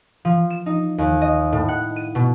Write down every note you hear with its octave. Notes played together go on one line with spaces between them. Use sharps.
F3
E7
D#4
D#2
D#5
A2
F#5
D#7
B2